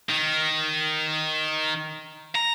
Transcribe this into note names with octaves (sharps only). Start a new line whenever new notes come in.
D#3
A#5